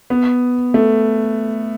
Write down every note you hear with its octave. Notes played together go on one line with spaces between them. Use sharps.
B3
A3